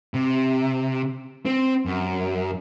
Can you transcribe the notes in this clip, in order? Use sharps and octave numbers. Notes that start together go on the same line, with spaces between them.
C3
C4
F#2